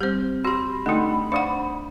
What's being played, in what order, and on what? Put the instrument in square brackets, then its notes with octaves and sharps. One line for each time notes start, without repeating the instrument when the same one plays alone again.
[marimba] G3 C4 [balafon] G4 C5 [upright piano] F6 G6
[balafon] F#4 G4 [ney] B5 [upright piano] C6 A#6
[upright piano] D3 G5 D#6 [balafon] A3 D#4 [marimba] D#5
[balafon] D4 F#5 [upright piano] C5 D5 D#6 [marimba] F5